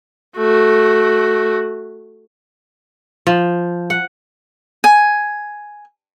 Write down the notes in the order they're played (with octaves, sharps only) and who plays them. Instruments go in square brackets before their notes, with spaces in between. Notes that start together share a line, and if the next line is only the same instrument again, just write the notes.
[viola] A3 F#4
[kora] F3
F#5
[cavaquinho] G#5